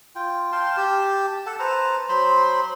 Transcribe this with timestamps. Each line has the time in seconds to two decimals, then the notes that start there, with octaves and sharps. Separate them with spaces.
0.15 F4 G5
0.52 F5 G5 A5 C6
0.77 G4 A5
1.46 A4 F#5 A5
1.59 B4 C5 A5 A#5
2.09 F#3 C5 B5 C6